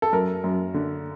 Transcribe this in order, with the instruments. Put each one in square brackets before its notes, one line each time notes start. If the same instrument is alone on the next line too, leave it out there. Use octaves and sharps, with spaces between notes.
[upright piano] A4
F#2 A#4
F#2
D3